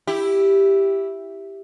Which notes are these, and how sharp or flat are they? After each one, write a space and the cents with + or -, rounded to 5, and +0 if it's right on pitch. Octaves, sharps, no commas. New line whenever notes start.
E4 +0 G4 +0